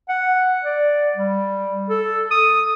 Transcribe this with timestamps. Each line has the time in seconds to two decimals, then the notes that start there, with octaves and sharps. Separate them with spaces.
0.09 F#5
0.64 D5
1.16 G3
1.90 A4
2.31 D#6